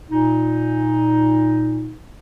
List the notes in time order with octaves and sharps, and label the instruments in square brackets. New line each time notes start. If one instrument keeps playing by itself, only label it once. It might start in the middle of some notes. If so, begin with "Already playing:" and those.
[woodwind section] A#2 D#4